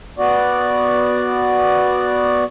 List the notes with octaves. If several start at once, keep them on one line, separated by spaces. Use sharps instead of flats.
B3 F#4 D5